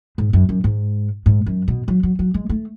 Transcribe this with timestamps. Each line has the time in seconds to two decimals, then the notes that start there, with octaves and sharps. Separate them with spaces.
0.18 G#2
0.33 F#2
0.49 F#2
0.64 G#2
1.26 G#2
1.46 F#2
1.68 B2
1.88 F#3
2.03 F#3
2.19 F#3
2.34 G#3
2.49 A3